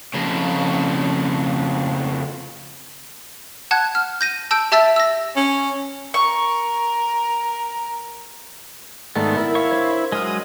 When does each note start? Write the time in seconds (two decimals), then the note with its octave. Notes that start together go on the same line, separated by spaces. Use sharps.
0.14 F2 C#3
3.71 F#5 A5 F#6 G#6
3.95 F6
4.21 G6 A#6 D#7
4.51 A5 E6 G6 D7
4.72 G4 E5 A5 E6 A6 B6
4.96 E6 A#6
5.36 C#4
6.14 A#4 C#6
9.16 G#2 D#3 A3 B3 D5
9.36 E4 A#4
9.55 C#5 F5 C#6
9.71 D4 C5 G#6
10.12 F#3 G#3 C6 D#6 F6